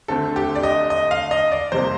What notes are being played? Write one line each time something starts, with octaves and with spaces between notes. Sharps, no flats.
D2 D3 A3 C4 A4
G4
D5
D#5
D#5
F5
D#5
D5
F2 C3 G3 A#3 C5